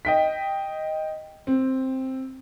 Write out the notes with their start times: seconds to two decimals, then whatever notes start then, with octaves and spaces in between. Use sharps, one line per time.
0.05 D#5 G5 B6
1.47 C4